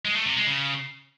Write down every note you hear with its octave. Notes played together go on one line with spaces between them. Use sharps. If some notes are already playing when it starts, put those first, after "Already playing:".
G#3
A3
C3
G#3
C#3